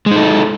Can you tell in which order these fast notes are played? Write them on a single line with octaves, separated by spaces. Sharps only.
G#3 D#4 A4